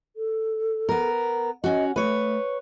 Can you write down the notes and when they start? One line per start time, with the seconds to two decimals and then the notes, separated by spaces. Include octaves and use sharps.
0.16 A4
0.89 B3 A#4
1.64 C#4 F#4 D#5
1.96 A3 B4 C#5